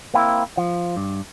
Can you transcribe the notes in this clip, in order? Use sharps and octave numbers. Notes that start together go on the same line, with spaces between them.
A#3 C4 E4
F3
G2